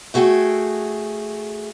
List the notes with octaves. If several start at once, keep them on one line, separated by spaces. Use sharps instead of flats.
A3 F#4 G#4 A4 G5